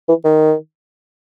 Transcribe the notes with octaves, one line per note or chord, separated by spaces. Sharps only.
E3
D#3